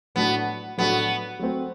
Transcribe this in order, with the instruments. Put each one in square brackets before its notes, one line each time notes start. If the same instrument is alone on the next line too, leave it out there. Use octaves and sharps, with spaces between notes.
[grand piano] A2 F#3 A3 D4 F#4 [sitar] B3
[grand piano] A2 F#3 A3 D4 F#4 [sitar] B3
[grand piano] F#3 A3 C4